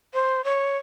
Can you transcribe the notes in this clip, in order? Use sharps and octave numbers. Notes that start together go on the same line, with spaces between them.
C5
C#5